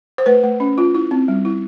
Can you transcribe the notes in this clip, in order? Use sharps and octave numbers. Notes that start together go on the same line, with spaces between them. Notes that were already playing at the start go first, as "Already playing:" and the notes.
C5
A3 B4
A3
C#4
F4
E4
C4
G3
E4